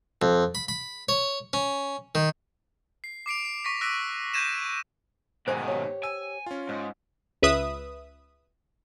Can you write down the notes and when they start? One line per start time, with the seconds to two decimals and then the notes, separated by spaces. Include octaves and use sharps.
0.22 F2
0.55 B5
0.68 B5
1.09 C#5
1.53 C#4
2.15 D#3
3.04 C7
3.26 D6 C7 D7 F7
3.45 C7
3.65 C#6 A#6 B6
3.81 D6 E6 F#6 A#6 B6 D7
4.34 C#6 G6 G#6 A#6 D#7 E7
5.48 D2 G#2 B2 D#3 G#3 C5 G#5
5.68 G4 C#5
6.03 G#5 E6
6.46 C#4 F4
6.69 G#2 C5
7.42 C#2 B4 E5 D#6